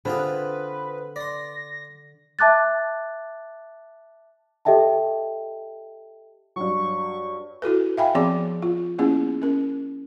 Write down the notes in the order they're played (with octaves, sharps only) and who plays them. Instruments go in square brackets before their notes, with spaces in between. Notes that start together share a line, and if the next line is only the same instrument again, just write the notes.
[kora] D3 [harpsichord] C4 F4 G#4 [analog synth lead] B4
[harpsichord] D5 C6 [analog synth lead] A#6
[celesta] E5 A5 D6 F#6 A6
G4 A4 D#5 E5 G5 A5
[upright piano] G2 F#3 [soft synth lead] C#6
[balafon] E4 F#4 A4 B4
E5 F5 G5 G#5 B5
F3 B3 C4 G#4 D5 D6
F4
A#3 B3 C#4 E4 G#4
C#4 A#4